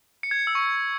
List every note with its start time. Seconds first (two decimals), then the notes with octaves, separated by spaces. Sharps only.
0.23 C#7
0.31 G#6
0.39 C#7
0.47 E6
0.55 C#6